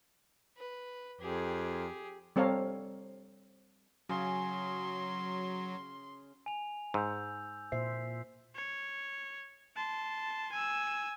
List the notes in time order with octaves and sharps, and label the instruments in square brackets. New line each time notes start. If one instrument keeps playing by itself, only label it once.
[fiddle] B4
[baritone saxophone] F2 [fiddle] G4 G#4
[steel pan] G3 C4 A4 C#5 F5 A#5
[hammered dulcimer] C#3 [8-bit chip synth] F#3 [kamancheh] C6
[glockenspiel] G#5 F7
[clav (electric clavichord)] G#2 [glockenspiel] E6 G6
[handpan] A#2 C5 E5 [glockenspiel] C7
[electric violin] C#5
A5 C6
G#5 E6